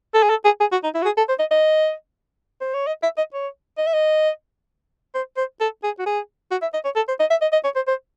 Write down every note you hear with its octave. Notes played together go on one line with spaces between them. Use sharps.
A4
G#4
A4
G#4
G#4
F#4
D#4
E4
F#4
G#4
A4
C5
D#5
D#5
C5
C#5
D#5
E5
D#5
C#5
D#5
E5
D#5
C5
C5
A4
G#4
F#4
G#4
F#4
E5
D#5
C#5
A4
C5
D#5
E5
D#5
D#5
C#5
C5
C5